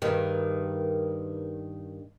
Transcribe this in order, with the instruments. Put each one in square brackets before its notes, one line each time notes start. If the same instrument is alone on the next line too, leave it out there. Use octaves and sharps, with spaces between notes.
[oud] G2 D#3 [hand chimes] G#4 A#4 B4